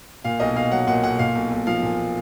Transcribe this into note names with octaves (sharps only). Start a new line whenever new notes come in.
A#2 F5
B1 D#5
B1 F5
F#3 F#5
A#2 F#5
B1 F#5
A#2 F5
B1
B1
F3 F5
A#2